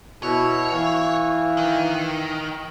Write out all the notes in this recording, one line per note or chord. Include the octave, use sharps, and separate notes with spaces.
B2 E4 C#5
E3 F5
D#3